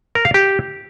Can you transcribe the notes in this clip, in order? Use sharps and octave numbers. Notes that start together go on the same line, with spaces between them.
A#4
F5
G4